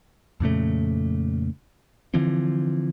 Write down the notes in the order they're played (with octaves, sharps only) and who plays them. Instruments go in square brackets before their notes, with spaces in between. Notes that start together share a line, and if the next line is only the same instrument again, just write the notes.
[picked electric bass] F2 A#2 C#3 A3
D3 E3 F3 C4